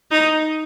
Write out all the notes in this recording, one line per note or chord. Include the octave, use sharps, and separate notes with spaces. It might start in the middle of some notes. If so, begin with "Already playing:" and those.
D#4